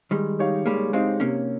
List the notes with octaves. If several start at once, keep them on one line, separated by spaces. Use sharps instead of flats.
D#3 G3 G#3
D#4 G4 C#5 F5
G3 G#3 A#3
G#3 C4 D#4 G4 C#5 F5
C3 A#3 C#4